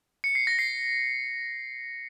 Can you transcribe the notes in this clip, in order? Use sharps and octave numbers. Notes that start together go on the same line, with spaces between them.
C#7
C7
A#6
C7